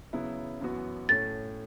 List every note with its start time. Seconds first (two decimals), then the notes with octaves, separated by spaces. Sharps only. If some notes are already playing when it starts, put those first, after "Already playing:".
0.13 C#3 F#3 B3 E4
0.61 F#2 E3 B3 F#4
1.09 A2 A3 C#4 A6